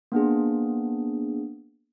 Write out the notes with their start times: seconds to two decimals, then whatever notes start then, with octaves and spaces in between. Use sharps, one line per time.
0.12 A#3 B3 D4 G#4